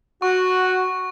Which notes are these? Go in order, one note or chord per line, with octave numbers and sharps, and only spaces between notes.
F#4 C#6